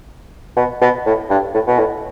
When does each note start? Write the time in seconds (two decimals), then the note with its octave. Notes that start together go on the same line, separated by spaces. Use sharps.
0.57 B2
0.81 B2
1.06 A2
1.30 G2
1.54 A2
1.67 B2
1.79 A2